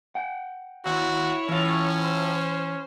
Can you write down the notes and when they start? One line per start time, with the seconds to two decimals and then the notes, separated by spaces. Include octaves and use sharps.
0.15 F#5 G5
0.85 D#2 E4 F#4 C#5
1.49 A2 E3 C#4 F4
2.01 C5